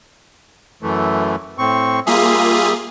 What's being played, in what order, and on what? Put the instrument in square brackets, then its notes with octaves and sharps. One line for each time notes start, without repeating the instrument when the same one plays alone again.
[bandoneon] F#2 E3 A3
A2 C4 C#6
[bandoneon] G3 E5 D#6 [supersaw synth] A#3 F4 G#4